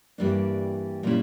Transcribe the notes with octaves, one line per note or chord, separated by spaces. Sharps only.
G2 E3 G3 A#3 D4
A#2 G3 C#4 E4